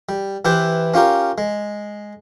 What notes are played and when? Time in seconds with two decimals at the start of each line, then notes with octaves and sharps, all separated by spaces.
0.09 G3
0.45 E3 E4 G4 B4 C5
0.94 C#4 F4 G4 A#4
1.38 G#3